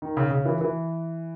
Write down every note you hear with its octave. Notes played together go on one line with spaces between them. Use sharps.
D#3
C#3
C#3
E3
E3